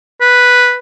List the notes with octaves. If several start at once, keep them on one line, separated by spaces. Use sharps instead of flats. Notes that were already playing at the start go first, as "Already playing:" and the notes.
B4